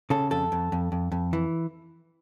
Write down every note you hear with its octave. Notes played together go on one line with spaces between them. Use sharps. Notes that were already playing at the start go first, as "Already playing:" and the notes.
C#3 A4
F2 A4
F2
F2
F2
F2
E3